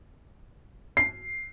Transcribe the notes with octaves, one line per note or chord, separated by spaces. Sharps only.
C7